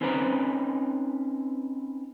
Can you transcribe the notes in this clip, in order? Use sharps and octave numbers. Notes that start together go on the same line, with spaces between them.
C4 C#4 D#4 B4 C5 A#5